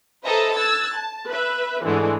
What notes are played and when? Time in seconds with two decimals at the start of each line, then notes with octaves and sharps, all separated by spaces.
0.25 A4 B4 C5 D#5 E5 A#5
0.56 E6 F#6 G#6 A6
0.96 A5
1.29 B4 E5
1.85 G#2 D3 E3 G#3 A3